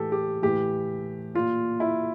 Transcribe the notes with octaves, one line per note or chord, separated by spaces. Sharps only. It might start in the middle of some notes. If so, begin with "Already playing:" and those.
Already playing: A2 E3 G4 A4
G4
A2 E3 G4
A#2 F4
E4